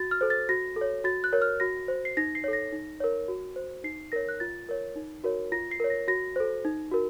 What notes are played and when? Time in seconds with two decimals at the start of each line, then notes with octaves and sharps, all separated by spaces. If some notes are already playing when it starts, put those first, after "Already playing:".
Already playing: F#4 A6
0.11 F6
0.21 A4 C5
0.30 A6
0.49 F#4 A#6
0.76 A4
0.81 C#5
1.04 F#4 A6
1.24 F#6
1.33 A#4 C#5
1.42 F6
1.60 F#4 A#6
1.88 C5
2.05 C7
2.17 D#4 A#6
2.35 C7
2.44 A4 C#5
2.53 A#6
2.72 D#4
3.00 A#4 C#5
3.28 F#4
3.56 C5
3.84 D#4 C7
4.12 A#4 C#5 A#6
4.29 F#6
4.40 F4 A6
4.69 A#4 C#5
4.96 D#4
5.24 F#4 A#4 C#5
5.52 F4 A#6
5.71 C7
5.80 A#4 C#5
5.90 A#6
6.08 F#4 A#6
6.36 A4 C5
6.65 D#4
6.91 F#4 A#4